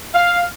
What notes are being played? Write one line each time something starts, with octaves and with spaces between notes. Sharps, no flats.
F5